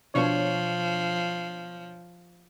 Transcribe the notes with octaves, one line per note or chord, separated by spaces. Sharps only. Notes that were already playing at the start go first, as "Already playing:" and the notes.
B2 F3 D4 C#5